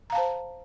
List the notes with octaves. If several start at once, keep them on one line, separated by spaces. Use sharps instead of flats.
C5 F5 A5 A#5